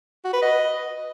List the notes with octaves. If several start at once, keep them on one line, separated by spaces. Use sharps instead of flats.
F#4
B4
D#5